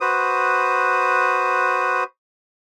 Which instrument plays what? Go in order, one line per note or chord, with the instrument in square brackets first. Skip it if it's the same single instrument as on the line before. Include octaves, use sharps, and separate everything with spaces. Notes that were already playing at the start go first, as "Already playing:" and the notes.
[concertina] F#4 B4 C5 D#6